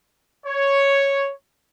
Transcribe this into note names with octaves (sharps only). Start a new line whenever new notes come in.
C#5